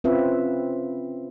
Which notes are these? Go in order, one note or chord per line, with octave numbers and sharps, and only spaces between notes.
C4 C#4 F4 B4 E5